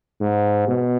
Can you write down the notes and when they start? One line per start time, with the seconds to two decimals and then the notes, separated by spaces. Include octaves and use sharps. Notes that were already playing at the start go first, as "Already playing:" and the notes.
0.21 G#2
0.67 B2